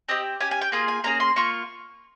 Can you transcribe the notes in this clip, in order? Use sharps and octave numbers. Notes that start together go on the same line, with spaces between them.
C4 G4 D#5
C#4 G4 G#5
G#5
G5
A#3 F4 G#4 G#5
G#5
A#3 C#4 G#4 A#5
C6
A#3 F4 C#6